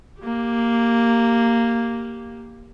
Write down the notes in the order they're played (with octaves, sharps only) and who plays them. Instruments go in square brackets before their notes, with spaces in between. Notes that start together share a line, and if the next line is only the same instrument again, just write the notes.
[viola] A#3 G4